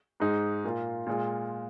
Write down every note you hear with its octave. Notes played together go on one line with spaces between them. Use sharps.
G#2 G#3 D#4
A#2 A#3 F4
A#2 G#3 F4